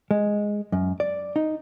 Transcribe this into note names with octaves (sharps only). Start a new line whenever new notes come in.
G#3
F#2
D5
D#4